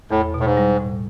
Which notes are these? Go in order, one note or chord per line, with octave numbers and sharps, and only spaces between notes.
E2 A2
B2
A2
G#2
G3
A2